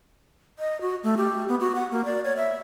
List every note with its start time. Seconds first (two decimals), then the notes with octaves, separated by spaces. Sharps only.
0.59 D#5
0.81 F#4
1.04 A3
1.17 G4
1.48 B3
1.60 F#4
1.75 F#5
1.91 A#3
2.05 D5
2.25 C#5
2.37 E5